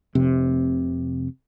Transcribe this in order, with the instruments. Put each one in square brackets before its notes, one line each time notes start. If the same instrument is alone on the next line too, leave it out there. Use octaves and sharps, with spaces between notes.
[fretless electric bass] F1 C3